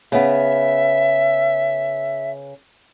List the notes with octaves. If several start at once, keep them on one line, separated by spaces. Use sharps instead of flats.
C#3 B3 E5